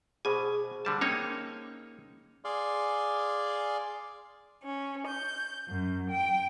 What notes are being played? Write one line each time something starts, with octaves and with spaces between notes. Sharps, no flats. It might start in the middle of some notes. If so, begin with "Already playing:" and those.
B2 G#4 C5 G#5
D3 G3 A5
A#3 C#4 D#4 C#5
G#4 D5 F5 C6
C#4
G6
F#2
G5